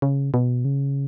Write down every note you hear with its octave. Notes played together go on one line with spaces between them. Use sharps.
C#3
B2
C#3